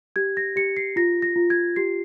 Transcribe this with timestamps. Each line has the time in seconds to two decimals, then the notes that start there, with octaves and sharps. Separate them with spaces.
0.16 G4 G#6
0.37 A#6
0.56 G4 C#7
0.77 C7
0.96 F4 A#6
1.22 A#6
1.36 F4
1.50 G#6
1.76 G4 C7